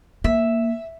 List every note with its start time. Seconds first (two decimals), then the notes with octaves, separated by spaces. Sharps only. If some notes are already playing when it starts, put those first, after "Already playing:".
0.24 A#3 E5